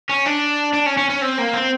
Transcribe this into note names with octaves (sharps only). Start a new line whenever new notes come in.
C#4
D4
D4
C#4
C#4
C#4
C4
A#3
C4